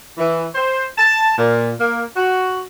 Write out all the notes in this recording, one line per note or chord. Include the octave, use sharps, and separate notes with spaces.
E3
C5
A5
A#2
A#3
F#4